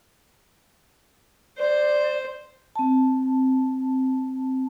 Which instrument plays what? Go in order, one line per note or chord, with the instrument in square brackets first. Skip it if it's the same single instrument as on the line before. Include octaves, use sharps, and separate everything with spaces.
[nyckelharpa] C5 [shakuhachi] D5
[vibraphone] C4 A5